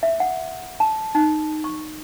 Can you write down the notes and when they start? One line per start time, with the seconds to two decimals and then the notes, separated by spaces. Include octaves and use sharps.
0.03 E5
0.20 F#5
0.80 A5
1.15 D#4
1.64 C#6